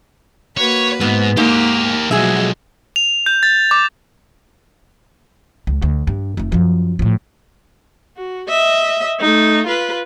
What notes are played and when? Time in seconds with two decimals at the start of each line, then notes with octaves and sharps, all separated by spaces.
0.57 A#3 F#4 B4 C#5
1.01 G#2 B3
1.37 G#2 A#3 G4 A#4
2.11 B1 F3 G#3 F#4 G#4 E5
2.96 F7
3.26 G6
3.43 A6
3.71 D6
5.67 C#2
5.82 D2
6.07 G2
6.37 F1 A3
6.52 F#2 F3
6.99 A2 F3
8.17 F#4
8.49 D#5 E5
9.20 A3 D#4
9.67 F4 B4